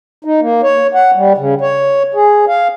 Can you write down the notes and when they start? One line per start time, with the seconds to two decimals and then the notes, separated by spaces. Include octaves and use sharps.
0.25 D#4
0.41 A#3
0.63 C#5
0.94 F#5
1.15 G3
1.38 C#3
1.61 C#5
2.14 G#4
2.48 F5